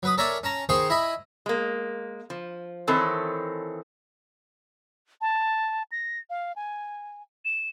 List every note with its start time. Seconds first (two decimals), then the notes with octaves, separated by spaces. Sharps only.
0.03 F#3 B4 D#6
0.18 A4 A#4 C#5 D5 E5 G#5
0.43 C#4 A5 A#5
0.69 D#3 G#4 C5 G5 C6 C#6
0.90 E4 D#5 G#5 B5
1.46 G#3 A#3
2.30 F3
2.87 D#3 E3 C4 A4 C#5
5.21 A5
5.92 A#6
6.30 F5
6.56 G#5
7.45 E7